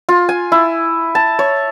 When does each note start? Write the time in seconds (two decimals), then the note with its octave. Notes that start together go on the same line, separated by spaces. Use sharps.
0.09 F4
0.29 G#5
0.52 E4
1.15 A5
1.39 C#5